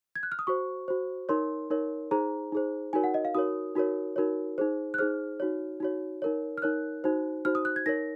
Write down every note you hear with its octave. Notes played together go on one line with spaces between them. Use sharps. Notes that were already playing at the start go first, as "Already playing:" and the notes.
G#6
F#6
F6
D#6
F#4 C5 C#6
F#4 C5
D#4 A#4 C#5 C6
D#4 A#4 C#5
D#4 G#4 C5 A#5
D#4 G#4 C5
D#4 F#4 A#4 C#5 G#5
F#5
D#5
F5
D#4 F#4 A#4 C#5 D#6
D#4 F#4 A#4 C#5
D#4 F#4 A#4 C#5
D#4 G#4 C5
F#6
D#4 G#4 C5 F6
D#4 F#4 C#5
D#4 F#4 C#5
D#4 A#4 C#5
F6
D#4 A#4 C#5 F#6
D#4 F#4 C5
D#4 F#4 C5 F6
D#6
F#6
G#6
D#4 A#4 C#5 A#6